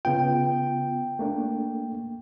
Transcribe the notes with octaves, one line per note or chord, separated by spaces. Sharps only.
C#3 B3 F4 G5
A3 A#3 D4